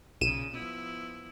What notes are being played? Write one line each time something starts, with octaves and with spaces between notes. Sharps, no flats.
B1 A#2 C#3 D#7 E7
F3 B3 E4